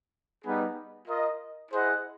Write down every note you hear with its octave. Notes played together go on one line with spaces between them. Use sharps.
G3 B3 D#4 G#4 B4
F4 A#4 D#5
E4 G#4 C5 D#5 F#5